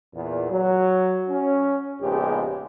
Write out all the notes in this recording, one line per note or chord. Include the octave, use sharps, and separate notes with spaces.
E2 A#2
F#3
C#4
A#1 G#2 C#3 G#3 B3 G4